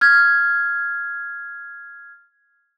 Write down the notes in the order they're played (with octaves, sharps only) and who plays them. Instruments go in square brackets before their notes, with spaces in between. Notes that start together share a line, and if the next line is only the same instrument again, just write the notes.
[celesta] F6 G#6